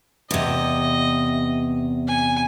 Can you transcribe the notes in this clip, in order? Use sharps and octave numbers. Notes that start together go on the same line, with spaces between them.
E2 C3 D#5
G#5